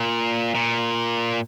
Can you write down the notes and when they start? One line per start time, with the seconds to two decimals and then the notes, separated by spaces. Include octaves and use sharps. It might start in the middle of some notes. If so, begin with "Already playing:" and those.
Already playing: A#2
0.55 A#2